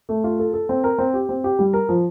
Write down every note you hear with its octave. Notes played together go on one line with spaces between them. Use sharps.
A3
F4
A4
A4
C4
A#4
C4
G4
C4
G4
G3
A#4
F3